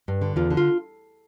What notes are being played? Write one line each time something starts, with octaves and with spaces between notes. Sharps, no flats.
G2
D3
E2 F4
D3
F4